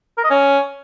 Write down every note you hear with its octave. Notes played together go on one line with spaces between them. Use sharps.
A#4
D#5
C#4